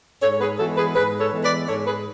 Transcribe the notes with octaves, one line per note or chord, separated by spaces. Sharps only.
G#2 A4 C#5
G#4 B4
E3 G#3 B3 F#4 A4
G#4 B4
G#2 G#4 B4
A4 C#5
E3 G#3 B3
B4 D5
G#2 A4 C#5
G#4 B4